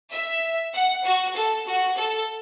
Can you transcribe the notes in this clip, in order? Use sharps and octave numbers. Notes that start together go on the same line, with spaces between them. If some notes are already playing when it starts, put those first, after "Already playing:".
E5
F#5
F#4
A4
F#4
A4